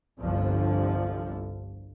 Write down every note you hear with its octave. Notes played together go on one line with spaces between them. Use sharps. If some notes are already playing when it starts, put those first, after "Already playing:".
G1 C2 D3 F3